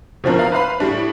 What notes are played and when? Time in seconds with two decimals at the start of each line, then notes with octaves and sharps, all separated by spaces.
0.24 B2 F3 C4 D4 A#4
0.39 F5 A#5
0.52 B4 C5 F5 B5
0.80 A2 G3 D4